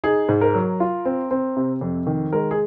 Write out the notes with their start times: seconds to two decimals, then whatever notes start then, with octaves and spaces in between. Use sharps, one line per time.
0.04 D#4 G#4
0.29 G#2
0.41 A#4
0.54 F#3
0.80 F4
1.05 C4
1.31 C4
1.56 C3
1.81 F2
2.07 D#3
2.33 G#3 A#4
2.51 G#4